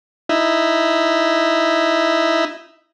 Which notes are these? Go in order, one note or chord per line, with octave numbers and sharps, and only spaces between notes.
D#4 E4